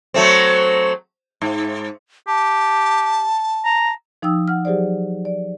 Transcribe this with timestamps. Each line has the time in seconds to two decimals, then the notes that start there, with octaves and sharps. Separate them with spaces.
0.14 F#3 A3 C4
1.42 G#2
2.28 G4 A5
3.65 A#5
4.22 F3 D#4 G5 D#6 E6
4.48 F#5 F6
4.65 F#3 G4 G#4 C5 D5
5.25 D5